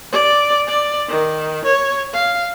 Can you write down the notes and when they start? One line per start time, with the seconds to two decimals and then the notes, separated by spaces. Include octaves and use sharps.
0.12 D5
0.67 D5
1.09 D#3
1.65 C#5
2.14 F5